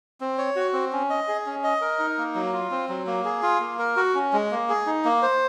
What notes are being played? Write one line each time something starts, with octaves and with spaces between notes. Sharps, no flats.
C4
C#5
F#4
C4
C#4
D#5
G#4
C#4
D#5
A#4
D#4
A#3
F#3
F4
C4
F#3
A#3
G#4
F4
A#3
A#4
F#4
C#4
G#3
A#3
G#4
D#4
A#3
C5